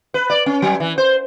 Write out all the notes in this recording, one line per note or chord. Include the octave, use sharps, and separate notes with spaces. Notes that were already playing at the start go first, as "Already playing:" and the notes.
B4
D5
C#4
F#3
E3
C5